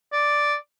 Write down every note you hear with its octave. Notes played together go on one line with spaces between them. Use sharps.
D5